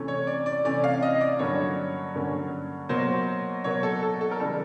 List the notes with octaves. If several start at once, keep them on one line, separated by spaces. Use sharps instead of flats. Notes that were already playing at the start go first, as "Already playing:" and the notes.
Already playing: C3 E3 A3 C#4
C#5
D5
D5
C3 E3 A3 C#4 D5
F5
D#5
D5
G2 D3 F#3 A#3 C#4 C#5
G2 D3 F#3 A#3 C#4
B2 F#3 A#3 C5
B2 F#3 A#3 C#5
A4
A4
A4
A#4
C#3 E3 G3 A4